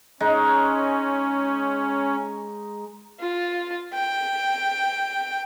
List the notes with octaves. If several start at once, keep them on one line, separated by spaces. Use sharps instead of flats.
G#3 C#4 D#4
F4
G5